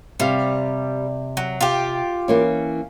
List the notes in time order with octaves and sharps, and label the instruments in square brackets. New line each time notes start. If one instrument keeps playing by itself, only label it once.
[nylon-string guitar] C3 F5 [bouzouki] G3
[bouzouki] F#3
F4 G4
[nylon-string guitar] E3 A#3 C#4